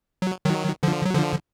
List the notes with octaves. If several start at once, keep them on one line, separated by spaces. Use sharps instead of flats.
F#3
D#3 F#3
D3 F3
F#3
D3 F3